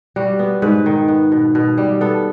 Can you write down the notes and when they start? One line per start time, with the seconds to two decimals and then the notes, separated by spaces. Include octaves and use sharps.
0.16 G3 F#4
0.39 B3
0.62 G#2 B4
0.86 D#3
1.08 B3
1.32 B2
1.55 B2
1.78 G3
2.01 B3 A4